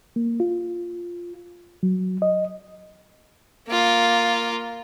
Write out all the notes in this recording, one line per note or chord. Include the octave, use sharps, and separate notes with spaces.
A#3
F4
F#3
D#5
A#3 F4